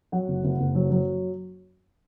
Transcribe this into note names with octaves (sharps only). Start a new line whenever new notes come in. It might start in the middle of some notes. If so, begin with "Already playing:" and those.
F#3 F#5
F#1
F#1
F#1
F#3
F#3